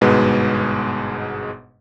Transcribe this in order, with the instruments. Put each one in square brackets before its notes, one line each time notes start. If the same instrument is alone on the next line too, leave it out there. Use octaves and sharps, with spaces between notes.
[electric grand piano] G1 G#2 B2 G#3 B4